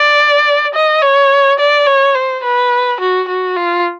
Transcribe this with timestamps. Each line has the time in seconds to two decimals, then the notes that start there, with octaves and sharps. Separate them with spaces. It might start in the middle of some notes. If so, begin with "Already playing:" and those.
Already playing: D5
0.74 D#5
1.02 C#5
1.59 D5
1.86 C#5
2.15 C5
2.44 B4
3.00 F#4
3.28 F#4
3.57 F4